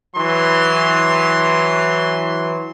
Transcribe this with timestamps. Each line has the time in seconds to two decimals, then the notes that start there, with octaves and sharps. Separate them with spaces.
0.16 E3 F#3 C6